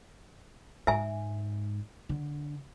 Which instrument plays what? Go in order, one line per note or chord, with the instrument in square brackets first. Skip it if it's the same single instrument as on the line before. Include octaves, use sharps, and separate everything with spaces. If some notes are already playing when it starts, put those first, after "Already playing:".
[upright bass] G#2 [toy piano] E5 G#5
[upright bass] D3